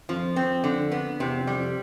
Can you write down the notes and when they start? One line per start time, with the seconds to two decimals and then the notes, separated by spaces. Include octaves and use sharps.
0.09 F2 F3
0.36 C4
0.64 D3
0.92 B3
1.19 E2 C3
1.39 F2
1.47 G3
1.57 F2